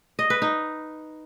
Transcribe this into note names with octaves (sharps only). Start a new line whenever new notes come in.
D#5
B4
D#4